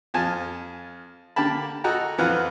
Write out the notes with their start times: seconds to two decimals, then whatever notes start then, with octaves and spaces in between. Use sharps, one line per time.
0.14 F2 F4 G#5 A5
1.36 D3 A#3 G4 A#4 A5 B5
1.84 F#4 A4 D#5 F#5 G5 A#5
2.18 F2 E3 F4 B4 F#5 F6